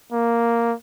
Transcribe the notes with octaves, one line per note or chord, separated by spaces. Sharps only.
A#3